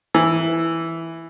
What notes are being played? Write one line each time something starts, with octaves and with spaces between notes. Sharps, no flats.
E3